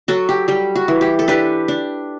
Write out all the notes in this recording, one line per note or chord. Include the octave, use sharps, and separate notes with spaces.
F#3 F#4 A4
G4
G3 G4
F#4
E3
G4
A4
D4 G4 B4
D4